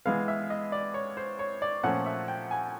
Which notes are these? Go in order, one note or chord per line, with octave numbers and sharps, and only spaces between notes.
E3 G#3 B3 F5
E5
D#5
D5
C#5
C5
C#5
D5
A#2 F3 A3 C#4 F#5
E5
G5
G#5